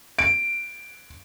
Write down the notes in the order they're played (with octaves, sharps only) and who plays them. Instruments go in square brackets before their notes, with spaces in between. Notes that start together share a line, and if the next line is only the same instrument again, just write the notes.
[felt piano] D7